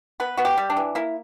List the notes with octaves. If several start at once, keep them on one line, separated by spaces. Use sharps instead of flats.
B3 B4
B3 F#4
G4
G3
D4
E3
A#3 E4